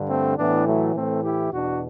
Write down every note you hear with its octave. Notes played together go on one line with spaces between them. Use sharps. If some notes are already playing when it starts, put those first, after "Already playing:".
Already playing: G2 D3
A3 C4
A2 E3 B3 D4
F#3 A3
A2 E3 A3 C4
E4 G4
E2 B2 D4 F#4